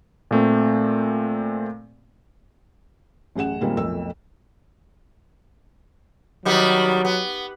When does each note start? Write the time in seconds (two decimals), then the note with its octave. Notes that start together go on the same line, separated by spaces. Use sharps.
0.31 A#2 A3 C4
3.35 A1 F#2 G#4 F#5 E7
3.61 A#2 D#3 G3 G#3 A#3 C4
3.77 B1 F2 A3 A#4 E6
6.45 D#3 F#3 G3 B3
7.05 B3